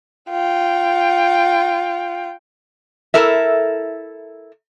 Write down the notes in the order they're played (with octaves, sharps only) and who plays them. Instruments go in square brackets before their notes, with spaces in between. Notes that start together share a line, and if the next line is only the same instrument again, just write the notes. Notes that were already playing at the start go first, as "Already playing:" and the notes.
[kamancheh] F4 G5
[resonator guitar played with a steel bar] E4 A4 A#4 E5